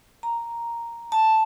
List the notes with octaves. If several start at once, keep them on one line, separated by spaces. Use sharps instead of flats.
A#5
A5